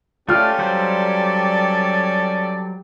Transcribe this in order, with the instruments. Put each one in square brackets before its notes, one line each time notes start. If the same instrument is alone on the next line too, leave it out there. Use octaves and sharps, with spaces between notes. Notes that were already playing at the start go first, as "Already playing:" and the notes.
[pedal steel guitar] A3 F6 [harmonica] C#4 G4 A4 [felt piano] F4 [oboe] D5
[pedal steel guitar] F#3 G3 C5 [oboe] D5